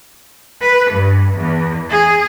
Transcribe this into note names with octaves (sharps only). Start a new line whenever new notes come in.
B4
G2
E2
G#4